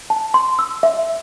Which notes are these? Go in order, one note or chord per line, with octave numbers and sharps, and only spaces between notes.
A5
C6
E6
E5